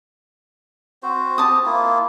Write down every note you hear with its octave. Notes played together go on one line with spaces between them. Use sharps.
C4 F#4 C5
C4 G4 A5 D#6
A#3 E4 F4